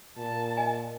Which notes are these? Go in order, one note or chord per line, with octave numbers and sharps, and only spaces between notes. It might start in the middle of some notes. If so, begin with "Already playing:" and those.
A#2 A5
D#5 G#5